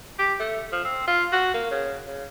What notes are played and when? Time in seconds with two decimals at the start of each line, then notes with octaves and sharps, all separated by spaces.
0.19 G4
0.40 A3
0.72 F3
0.85 C4
1.08 F4
1.33 F#4
1.54 A#3
1.71 C#3
2.07 C#3